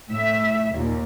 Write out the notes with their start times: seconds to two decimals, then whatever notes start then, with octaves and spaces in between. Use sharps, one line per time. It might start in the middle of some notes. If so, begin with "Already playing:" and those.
0.10 A2 E5
0.75 D#2 A#2